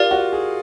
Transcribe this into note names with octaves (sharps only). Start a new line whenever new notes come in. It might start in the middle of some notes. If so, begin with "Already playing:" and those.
Already playing: F4 G4 A#4 D5
F#4
G#4